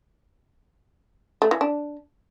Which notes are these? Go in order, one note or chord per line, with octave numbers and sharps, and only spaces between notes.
A3
E3
D4